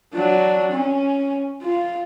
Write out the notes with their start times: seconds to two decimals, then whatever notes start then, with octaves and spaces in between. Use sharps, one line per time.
0.14 F#3 D4
0.72 C#4
1.62 F4